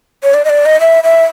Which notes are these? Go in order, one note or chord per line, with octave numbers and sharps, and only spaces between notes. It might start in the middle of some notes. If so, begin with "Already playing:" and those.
C#5
D5
D#5
D5
D#5
E5
E5